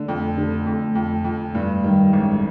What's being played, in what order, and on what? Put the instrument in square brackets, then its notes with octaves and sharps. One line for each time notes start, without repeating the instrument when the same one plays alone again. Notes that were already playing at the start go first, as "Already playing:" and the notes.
Already playing: [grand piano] D3 [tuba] A3
[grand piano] F2
D3
F2
F2
F2
[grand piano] G2 [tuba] A3
[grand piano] D#3 [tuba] G3
[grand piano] A1 [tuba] G#3